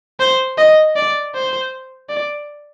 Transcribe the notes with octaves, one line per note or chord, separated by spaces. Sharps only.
C5
D#5
D5
C5
D5